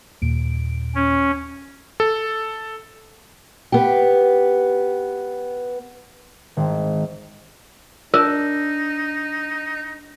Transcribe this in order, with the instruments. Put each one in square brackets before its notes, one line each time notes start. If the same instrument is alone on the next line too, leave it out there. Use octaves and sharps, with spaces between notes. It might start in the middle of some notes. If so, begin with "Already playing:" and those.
[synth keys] D#2 A#2 D7
[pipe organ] C#4
[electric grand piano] A4
[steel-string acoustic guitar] B3 G4
[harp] G#1
[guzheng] D4 [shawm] D#4 [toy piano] A#4